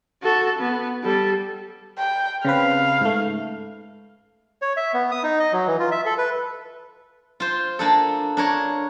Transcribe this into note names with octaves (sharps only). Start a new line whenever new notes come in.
F#4 A4
B3
G3 A4
G5
C#3 C4 B4 F5
G#2 A3
C#5
E5
B3
D#6
D#4
D#5
F#3
E3
F4
E5
A4
B4
F4 C5
A#3 D4 A4
D4 A#4 C#5